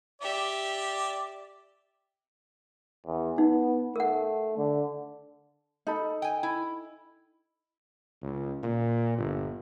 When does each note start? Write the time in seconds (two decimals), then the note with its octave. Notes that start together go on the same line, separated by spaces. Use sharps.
0.22 G4 D5 E5
3.06 E2
3.38 B3 D#4
3.96 A3 A#4 F#5
4.57 D3
5.87 D#4 A4 B5
6.22 G5 G#5
6.43 E4
8.22 C#2
8.63 A#2
9.18 G1